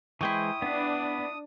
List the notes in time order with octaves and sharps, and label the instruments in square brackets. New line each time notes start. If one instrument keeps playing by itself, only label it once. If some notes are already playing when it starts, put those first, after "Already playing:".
[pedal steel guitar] E3 G#3 C5 [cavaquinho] E4 G5 C#6 [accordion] D#6
[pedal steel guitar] B3 B4 [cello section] D4